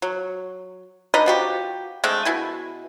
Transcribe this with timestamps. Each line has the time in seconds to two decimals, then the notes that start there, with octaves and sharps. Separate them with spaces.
0.02 F#3
1.14 D4 D#4 B4 D#5
1.26 F3 F#4 G4
2.04 G#3 A3 C4 D4
2.25 B2 E4 G#5